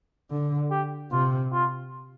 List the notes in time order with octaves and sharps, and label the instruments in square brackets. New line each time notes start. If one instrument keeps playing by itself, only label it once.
[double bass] D3
[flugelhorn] G4
[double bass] C3 [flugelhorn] F4
[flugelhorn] F4